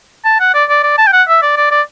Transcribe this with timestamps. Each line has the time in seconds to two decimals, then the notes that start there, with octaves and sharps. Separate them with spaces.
0.25 A5
0.40 F#5
0.54 D5
0.69 D5
0.83 D5
0.98 A5
1.07 G5
1.13 F#5
1.28 E5
1.42 D5
1.57 D5
1.71 D5